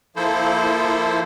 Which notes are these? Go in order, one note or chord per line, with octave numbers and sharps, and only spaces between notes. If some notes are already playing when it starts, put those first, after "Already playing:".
F3 A#3 E4 A4 C5